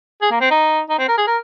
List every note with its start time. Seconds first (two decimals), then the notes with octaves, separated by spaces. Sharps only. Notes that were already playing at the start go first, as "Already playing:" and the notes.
0.22 G#4
0.31 A#3
0.41 C4
0.51 D#4
0.89 D#4
0.98 C4
1.08 A#4
1.18 G#4
1.27 A#4